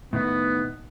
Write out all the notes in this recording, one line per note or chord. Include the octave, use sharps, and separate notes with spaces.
A2 D#3 B3 D#4